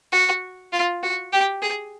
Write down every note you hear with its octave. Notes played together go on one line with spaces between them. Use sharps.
F#4
F4
F#4
G4
G#4